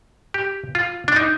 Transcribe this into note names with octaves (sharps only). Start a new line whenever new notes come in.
G4
F4
D4
D#4